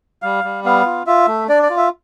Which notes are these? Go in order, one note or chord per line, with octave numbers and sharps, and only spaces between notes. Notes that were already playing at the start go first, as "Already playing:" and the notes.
G3 F5
G3
B3 F5
F4
F4 E5
A3
D4 D5
D5
F4
E5